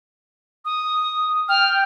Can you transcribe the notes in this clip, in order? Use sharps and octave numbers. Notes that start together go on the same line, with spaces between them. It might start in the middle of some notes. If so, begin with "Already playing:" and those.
D#6
G5 F6